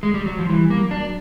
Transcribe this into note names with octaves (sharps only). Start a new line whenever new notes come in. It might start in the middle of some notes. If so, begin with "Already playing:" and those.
G#3
G3
F#3
F3
E3 G3
A#3
F#3
D4